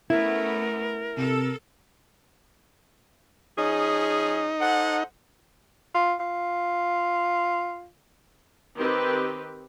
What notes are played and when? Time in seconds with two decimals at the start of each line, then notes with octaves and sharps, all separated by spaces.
0.10 A3 B3 C#4 E4 A#4
1.17 C3 A4
3.58 F3 C#4 D#4 G#4
4.60 A4 C5 F#5
5.94 F4
6.20 F4
8.77 D#3 C4 G4 B4